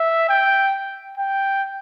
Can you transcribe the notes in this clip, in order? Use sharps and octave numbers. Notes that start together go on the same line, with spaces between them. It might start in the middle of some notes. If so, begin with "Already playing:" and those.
Already playing: E5
G5
G5